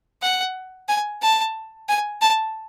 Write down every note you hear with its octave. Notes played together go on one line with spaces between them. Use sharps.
F#5
G#5
A5
G#5
A5